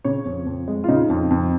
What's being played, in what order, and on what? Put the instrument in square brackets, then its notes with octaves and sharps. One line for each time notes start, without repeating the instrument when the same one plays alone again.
[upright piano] C#3 C#5
F2
F2
G#3
F4
C#3 D#4
F2
F2